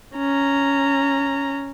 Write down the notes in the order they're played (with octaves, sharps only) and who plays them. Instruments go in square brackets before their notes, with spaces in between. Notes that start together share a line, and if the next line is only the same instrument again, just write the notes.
[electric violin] C#4 A#5